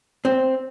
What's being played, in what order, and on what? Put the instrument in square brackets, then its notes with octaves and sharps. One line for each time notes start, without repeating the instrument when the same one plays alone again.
[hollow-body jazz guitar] C4